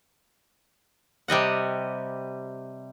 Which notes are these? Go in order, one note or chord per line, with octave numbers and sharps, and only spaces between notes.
C3 G3 D#5 F#5